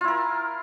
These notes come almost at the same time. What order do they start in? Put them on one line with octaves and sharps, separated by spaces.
F4 E4 A#4